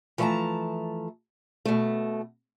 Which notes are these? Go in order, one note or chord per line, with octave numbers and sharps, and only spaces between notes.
E3 F3 A3 C5 A5 A#5
B2 A3